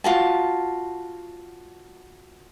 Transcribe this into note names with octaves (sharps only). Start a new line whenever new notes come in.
F4 F#4 A5